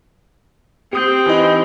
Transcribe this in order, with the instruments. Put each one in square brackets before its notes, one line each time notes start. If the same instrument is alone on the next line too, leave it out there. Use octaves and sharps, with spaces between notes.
[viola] C4 [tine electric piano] G4 D#6 G6
[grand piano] E3 D#4